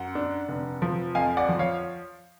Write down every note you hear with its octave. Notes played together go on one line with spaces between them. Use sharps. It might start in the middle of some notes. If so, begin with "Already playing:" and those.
Already playing: F#2 F#5
D4
F1
F3
F2 F5 G#5
D5 F#5
F3
C#5 F5